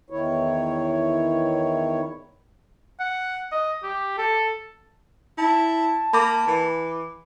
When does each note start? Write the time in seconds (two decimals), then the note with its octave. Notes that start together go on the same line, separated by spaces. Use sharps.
0.10 E2 D#3 E4 C#5
3.00 F#5
3.52 D#5
3.83 G4
4.18 A4
5.38 E4 A5
6.13 A#3 B5 D6
6.47 E3